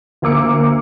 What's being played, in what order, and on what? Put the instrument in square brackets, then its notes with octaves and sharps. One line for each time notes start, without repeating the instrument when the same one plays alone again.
[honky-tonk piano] D2 A#3 D6 C#7